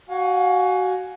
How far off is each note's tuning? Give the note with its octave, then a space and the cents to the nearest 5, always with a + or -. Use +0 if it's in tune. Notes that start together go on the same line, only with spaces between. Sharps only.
F#4 +15 F5 +40 G#5 +5